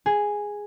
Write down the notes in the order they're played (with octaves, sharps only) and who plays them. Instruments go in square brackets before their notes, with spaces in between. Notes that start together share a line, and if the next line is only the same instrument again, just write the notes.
[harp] G#4